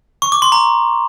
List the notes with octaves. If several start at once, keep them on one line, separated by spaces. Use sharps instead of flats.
C#6
D6
C6
A#5